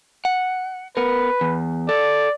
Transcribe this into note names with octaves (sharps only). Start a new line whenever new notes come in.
F#5
B3 A#4 B4
E2
A4 D5